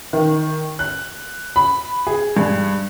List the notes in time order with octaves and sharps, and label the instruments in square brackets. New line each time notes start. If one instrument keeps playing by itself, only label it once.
[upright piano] D#3
F#6
B5
G#4
G2